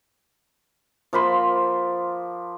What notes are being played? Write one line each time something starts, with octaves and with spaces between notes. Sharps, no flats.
F3 A#3 B5 C6